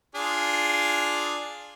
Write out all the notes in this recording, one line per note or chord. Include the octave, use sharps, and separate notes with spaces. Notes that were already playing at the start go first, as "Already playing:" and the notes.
D4 F4 G#4